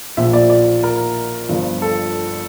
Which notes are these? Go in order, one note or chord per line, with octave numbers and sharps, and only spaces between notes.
A#1 A#2 F3 E5
D5
D5
A#4
G1 G2 F3
A4